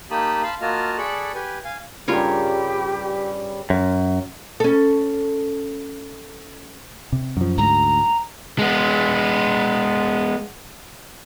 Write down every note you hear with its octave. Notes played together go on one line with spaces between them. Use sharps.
A#3 D#4 G4 A5 B5 D#6
F5 A5 B5 C6
A#3 F4 F#4 D#5 A5 F6
G#4 A4 D5 B5 C#6 F#6
G4 B4 G#5
F5 G#5
G2 C#3 G3 F4 G4 A#4 C#5
F#2
C#4 A4
C3
F#2 F3
D2 G#2 A#5
G#3 B3